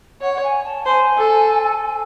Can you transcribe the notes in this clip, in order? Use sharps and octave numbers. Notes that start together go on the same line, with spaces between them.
C#5 F#5
F#5
G#5
A5
C5 G#5
A4